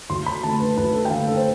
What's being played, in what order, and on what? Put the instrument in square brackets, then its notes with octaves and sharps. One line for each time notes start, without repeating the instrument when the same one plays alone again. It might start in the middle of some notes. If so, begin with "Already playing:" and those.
[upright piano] D2 C6
B5
D3 A3 A5
B4
D2 B4
A4
G5
D3 A3 F5
A4
C5